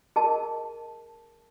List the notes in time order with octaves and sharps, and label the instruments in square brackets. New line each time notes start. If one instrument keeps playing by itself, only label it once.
[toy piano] G#4 A#4 D#5 A5